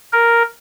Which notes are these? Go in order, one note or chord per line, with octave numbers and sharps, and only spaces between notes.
A#4